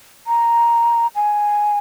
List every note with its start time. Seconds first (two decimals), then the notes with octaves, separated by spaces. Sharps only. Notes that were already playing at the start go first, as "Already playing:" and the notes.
0.27 A#5
1.16 G#5